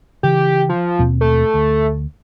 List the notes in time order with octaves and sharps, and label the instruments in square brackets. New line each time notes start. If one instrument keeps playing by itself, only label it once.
[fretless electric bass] C#3 E3 [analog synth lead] G4
[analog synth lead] F3
[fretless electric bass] D#2 B2 C4
[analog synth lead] A3
[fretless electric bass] D2